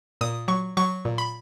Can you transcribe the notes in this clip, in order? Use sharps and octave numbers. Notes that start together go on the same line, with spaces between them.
A#2 D#6
F#3 C#6
F#3 C#6
A#2
B5